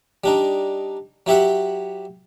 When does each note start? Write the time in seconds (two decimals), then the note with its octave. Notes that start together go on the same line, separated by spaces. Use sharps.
0.24 G3 D4 D#4
1.26 F#3 E4 G4 E5 F#5